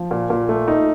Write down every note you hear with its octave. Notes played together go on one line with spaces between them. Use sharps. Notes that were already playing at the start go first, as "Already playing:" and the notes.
Already playing: F3
A#2
A#2
A3
D#4